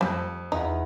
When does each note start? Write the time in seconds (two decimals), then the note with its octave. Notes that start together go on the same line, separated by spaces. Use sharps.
0.01 F2 F3 G3
0.52 E2 D#4 F4 B5